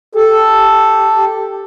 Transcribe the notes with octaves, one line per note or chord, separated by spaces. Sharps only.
G4 A4